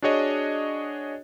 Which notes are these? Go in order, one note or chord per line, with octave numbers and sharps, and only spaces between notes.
D4 F#4 G#4 C#5 D#5